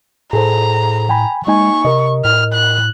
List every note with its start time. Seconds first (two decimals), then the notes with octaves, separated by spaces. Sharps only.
0.33 A2 G#4 A4 C5 A#5
1.09 G5 G#5 B5
1.47 G#3 A#3 D#4 G#5 C#6
1.85 C3 A#4 D#5
2.25 A2 F6
2.54 F#6